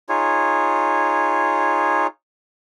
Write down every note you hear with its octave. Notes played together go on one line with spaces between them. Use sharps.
D#4 F4 G#4 C#5